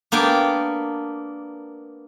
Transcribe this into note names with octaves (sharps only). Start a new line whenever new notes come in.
A#3 B3 D4 G5 G#5